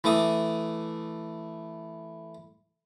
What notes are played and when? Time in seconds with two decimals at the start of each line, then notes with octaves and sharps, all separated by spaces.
0.04 E3 A3 D6 D#6